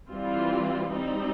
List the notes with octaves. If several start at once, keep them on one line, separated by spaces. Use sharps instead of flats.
E3 G3 C4 F4
G3 C4 D#4